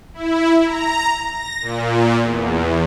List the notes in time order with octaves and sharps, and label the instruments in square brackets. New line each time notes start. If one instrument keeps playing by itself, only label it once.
[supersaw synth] E4
A#5
A#6
A#2
E2